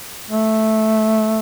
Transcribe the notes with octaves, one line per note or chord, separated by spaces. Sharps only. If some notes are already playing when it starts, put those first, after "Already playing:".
A3